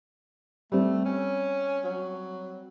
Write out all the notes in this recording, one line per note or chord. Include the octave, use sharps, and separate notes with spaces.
G3 A3 C4
C#4
F#3